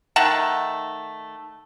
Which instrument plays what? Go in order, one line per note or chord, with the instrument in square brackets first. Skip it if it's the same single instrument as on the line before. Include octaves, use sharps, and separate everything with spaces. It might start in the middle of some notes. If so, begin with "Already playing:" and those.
[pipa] D#3 A3 F#5 A5